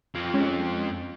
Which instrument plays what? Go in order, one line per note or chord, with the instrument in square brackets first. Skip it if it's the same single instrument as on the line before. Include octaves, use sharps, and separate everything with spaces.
[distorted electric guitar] F2 F3
[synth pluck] G#3 C#4